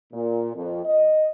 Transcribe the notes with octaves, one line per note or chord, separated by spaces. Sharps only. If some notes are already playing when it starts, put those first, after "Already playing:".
A#2
F2
D#5